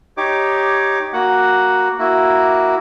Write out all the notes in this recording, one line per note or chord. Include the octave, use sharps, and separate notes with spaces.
D#4 G4 C#5 D6
A#3 F#4 F#5
A#3 E4 F#4